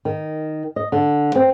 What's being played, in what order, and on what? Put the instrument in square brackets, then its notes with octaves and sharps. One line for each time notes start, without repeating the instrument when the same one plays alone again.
[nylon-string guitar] D#3
D#5
D3
C4